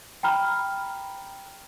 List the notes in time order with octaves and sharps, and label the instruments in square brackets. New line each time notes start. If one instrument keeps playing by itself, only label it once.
[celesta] G5 A#5 B5 F6